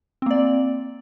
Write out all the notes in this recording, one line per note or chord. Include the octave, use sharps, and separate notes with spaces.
A#3 C4 D5